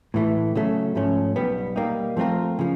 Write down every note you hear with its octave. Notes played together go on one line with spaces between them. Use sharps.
A2 E3 A3
C#3 F#3 A3
G#2 F3 A3 C#4
B1 B2 G3 B3
G3 A#3 D#4
F3 A3 C4 F4 A#4
C#3 F3